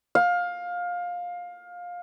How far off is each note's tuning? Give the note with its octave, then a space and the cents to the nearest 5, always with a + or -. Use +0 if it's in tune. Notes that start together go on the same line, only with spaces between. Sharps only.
F5 +20